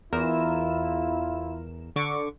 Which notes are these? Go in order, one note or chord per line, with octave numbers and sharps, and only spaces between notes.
E2 E4 F4 A#4 E7
D3 C#6 D6